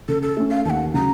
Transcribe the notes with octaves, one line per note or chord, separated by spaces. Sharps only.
C#3 A4
A4
A3 C#4
F5
D#2 F#5 A5
C#3 F#3 A#5